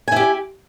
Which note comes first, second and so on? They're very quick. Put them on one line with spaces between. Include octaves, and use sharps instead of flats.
G#5 E4 G4